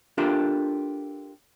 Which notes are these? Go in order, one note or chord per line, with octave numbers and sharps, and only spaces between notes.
D4 F4 G4 A4 A#4 E5